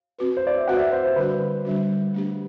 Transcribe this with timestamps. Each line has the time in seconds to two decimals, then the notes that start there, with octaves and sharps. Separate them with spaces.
0.19 C4 F#4 B4
0.37 C5
0.47 D5
0.57 E5
0.67 C4 F#4 B4 F#5
0.76 D5
0.79 E5
0.92 C5
1.04 C5
1.16 D3 G3 D4 F#4 B4
1.65 D3 G3 D4 F#4
2.14 A3 D4 G4